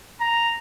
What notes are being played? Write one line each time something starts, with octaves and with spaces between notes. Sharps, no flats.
A#5